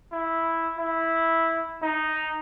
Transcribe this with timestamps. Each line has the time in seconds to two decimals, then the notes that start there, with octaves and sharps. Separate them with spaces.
0.13 E4
0.79 E4
1.82 D#4